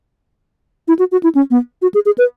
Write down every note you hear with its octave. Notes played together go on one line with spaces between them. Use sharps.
E4
F#4
F#4
E4
C#4
B3
F#4
G#4
G#4
B4